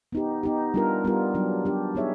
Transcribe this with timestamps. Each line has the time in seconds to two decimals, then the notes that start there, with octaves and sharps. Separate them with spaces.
0.12 B3 D#4 G4
0.43 B3 D#4 G4
0.74 G3 B3 D4 F4 A#4
1.04 G3 B3 D4 F4 A#4
1.34 F#3 B3 D4 G4
1.65 F#3 B3 D4 G4
1.95 B3 D#4 G#4 C#5 E5